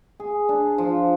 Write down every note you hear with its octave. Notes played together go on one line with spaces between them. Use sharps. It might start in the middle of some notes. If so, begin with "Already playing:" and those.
G#4
D4
F3